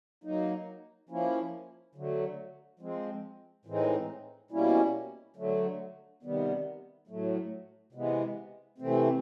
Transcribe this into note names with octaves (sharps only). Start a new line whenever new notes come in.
F#3 A#3 D#4
F3 A#3 C#4 E4
D3 F#3 A3
F3 G#3 C4
A2 E3 G#3 C4 D#4
B2 G3 A#3 C#4 E4
D3 F#3 A3
C3 D#3 G3 B3
A2 F#3 A3
C3 E3 G#3 B3
C3 E3 A3 C4